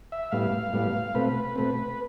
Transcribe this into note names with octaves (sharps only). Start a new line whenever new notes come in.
E5
A2 G3 B3 F5
A2 G3 B3
B2 A3 C4 B4
B2 A3 C4